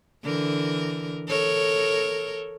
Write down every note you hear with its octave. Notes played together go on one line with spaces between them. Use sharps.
D3 E3 A#4
A4 A#4 C#5